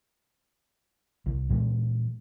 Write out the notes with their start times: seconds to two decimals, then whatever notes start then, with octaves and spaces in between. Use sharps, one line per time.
1.26 C2
1.49 A#2 E3 G#3